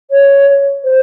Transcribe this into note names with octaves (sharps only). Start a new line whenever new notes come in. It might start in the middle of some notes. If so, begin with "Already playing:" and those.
C#5
C5